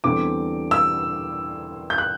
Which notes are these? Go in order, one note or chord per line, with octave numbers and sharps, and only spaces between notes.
E2 D3 G3 C4 D6
E6
G6
F#6